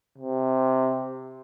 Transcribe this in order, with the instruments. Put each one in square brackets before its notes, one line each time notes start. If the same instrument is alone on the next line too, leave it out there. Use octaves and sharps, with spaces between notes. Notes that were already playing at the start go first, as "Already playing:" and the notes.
[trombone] C3